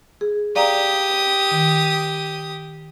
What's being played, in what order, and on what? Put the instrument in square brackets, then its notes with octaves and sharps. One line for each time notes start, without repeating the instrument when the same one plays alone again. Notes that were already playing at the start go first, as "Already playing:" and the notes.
[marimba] G#4
[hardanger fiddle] G4 D#6 [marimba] D5 F5 A#5
[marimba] D#3